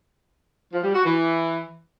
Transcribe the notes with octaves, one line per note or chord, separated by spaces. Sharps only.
F3
G3
F#4
E3